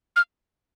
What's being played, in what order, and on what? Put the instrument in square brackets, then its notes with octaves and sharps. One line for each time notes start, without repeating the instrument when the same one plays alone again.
[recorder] F6